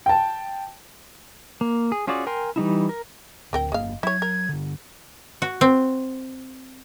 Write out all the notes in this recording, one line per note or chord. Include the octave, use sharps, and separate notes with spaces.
G5 A5
A#3
G#4
C#4 F4 F#4 G#4 D5
A#4 G5 G#5 C6
E3 G3 D#4 E4
A#4
D1 D2 C4 A#4 G5
G1 G#3 A#3 F5
F#3 E4 C#5 G#6
A#4
G2 D3
F#4
C4